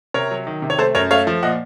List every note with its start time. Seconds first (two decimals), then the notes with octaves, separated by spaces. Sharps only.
0.14 C3 A#4 C#5
0.31 F#3
0.47 D#3
0.62 C3
0.70 C#5
0.78 A3 A4 C5
0.95 F#2 A#4 C#5
1.11 A3 C#5 F5
1.27 F3
1.43 A#2 D#5 F#5